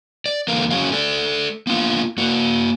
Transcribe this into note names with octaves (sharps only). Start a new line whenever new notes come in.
D5
E2 D3 A3 A#3 A#4 F5
F#3 C#4 F#4 G#4 C#5 F5
A3 A4 D5
A#3 B3 D4 F4 F5
A#3 F#4